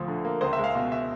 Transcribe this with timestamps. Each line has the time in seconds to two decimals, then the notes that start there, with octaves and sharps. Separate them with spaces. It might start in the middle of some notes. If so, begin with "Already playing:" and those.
Already playing: D2 F3
0.08 D3
0.25 A#3
0.41 C#2 C5
0.53 E5
0.58 G#3
0.64 F5
0.75 B2 F5
0.92 E5